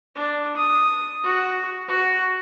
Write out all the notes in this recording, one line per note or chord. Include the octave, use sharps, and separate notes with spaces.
D4
D#6
F#4
F#4